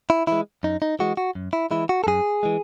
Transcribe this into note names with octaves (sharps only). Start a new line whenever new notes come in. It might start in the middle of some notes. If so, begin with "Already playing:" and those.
E4
E3 G#3 E4
F#2 D#4
D#4
E3 G#3 F#4
F#4
F#2
E4
E3 G#3 E4
F#4
A4
F#2 G#4
E3 G#3